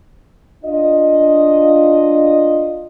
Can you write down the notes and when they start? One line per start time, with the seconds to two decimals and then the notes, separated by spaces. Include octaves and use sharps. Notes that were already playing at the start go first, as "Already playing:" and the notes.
0.64 D4 F4 D#5